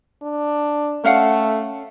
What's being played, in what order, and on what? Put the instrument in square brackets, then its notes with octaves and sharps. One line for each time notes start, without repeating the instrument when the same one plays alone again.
[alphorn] D4
[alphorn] A3 [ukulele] C#4 F5 F#5